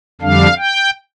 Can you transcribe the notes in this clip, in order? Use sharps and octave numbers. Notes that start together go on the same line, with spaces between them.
F2 D3 G3 D4 F5
G5